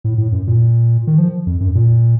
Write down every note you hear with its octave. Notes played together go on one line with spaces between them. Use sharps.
A2
A2
F#2
A#2
D#3
F3
F2
F#2
A#2